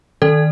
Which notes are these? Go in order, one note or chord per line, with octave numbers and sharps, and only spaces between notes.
D#3 A4